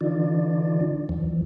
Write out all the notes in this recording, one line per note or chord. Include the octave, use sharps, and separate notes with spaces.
D3 E3 D4 D#4 F4 D5
E2 E3 F3